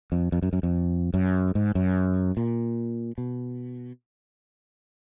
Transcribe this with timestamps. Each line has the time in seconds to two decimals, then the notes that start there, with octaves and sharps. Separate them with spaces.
0.12 F2
0.32 F2
0.43 F#2
0.53 F#2
0.63 F2
1.14 F#2
1.55 G#2
1.75 F#2
2.37 A#2
3.18 B2